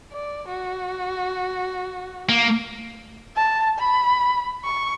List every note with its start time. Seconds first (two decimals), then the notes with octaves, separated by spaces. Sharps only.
0.13 D5
0.49 F#4
2.29 A#3
3.36 A5
3.79 B5
4.64 C#6